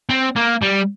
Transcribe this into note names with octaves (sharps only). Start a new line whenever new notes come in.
C4
A#3
G3